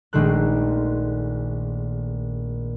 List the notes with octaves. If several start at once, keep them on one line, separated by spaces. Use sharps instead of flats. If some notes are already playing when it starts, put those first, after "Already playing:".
A#1 D#3 G#3 A3 F#6